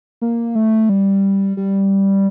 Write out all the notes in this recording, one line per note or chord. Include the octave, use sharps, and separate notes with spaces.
A#3
A3
G3
G3